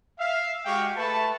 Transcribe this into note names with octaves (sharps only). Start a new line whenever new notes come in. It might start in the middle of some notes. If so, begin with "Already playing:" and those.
E5 F5
G#3 F#4 G4 F5 G5 C#6
A3 B4 A5